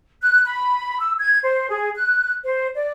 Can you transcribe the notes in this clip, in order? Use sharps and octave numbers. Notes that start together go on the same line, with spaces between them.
F#6
B5
E6
G#6
C5
G#4
F#6
C5
D5